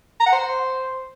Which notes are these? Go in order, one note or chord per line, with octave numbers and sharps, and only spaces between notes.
A#5
F#5
C5